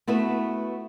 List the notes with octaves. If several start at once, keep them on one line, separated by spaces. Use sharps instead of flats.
A3 B3 E4 F#4 B4